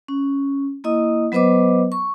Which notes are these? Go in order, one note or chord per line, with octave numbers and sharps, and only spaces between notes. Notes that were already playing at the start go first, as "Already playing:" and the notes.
C#4
A#3 E4 D#5 D#6
F#3 B3 B4 C5 D#5 D6
C#6